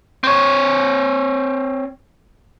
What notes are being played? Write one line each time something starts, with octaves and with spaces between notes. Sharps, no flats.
C4 C#5